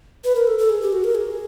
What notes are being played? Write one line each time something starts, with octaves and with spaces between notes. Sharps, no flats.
B4
A#4
A4
A4
G#4
G4
F#4
A#4
G#4